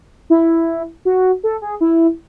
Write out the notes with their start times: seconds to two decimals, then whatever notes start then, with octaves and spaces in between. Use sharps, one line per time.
0.30 E4
1.05 F#4
1.44 A4
1.62 G#4
1.81 E4